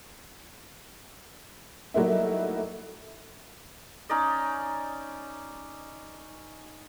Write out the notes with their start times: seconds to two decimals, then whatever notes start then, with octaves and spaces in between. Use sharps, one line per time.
1.94 F#3 G3 A3 A#3 D#4 E4
4.09 C#4 D#4 D5 D#5